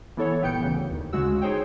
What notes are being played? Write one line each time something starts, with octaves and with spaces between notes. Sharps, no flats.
E3 B3 E4 A4 C#5
G1 A#2 B3 G5 G6 C#7
D2 C#3 E3
D#2
D2 C#3 G#3 F#4 E6
D#4 G#4 C5 C#5 G5